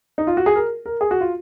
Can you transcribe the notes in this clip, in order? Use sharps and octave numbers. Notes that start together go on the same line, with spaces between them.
D#4
F4
F#4
G#4
A#4
A#4
G#4
F#4
F4